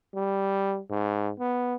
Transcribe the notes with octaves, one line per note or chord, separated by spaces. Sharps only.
G3
G#2
B3